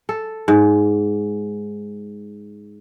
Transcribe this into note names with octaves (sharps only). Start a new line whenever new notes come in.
A4
G#2